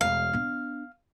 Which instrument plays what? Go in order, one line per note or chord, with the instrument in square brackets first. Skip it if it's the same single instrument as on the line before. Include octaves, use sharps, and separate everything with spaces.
[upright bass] E1 A3 [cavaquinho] F5
[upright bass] B3 D4